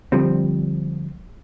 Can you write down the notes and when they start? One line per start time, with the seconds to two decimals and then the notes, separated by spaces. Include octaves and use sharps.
0.12 D3 F3 G3 C4